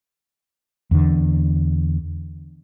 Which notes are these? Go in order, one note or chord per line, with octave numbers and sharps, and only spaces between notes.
E2 D3